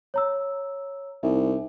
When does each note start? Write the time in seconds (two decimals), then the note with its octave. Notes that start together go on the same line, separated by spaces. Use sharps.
0.14 C#5 A#5 E6
1.23 C2 D#4 E5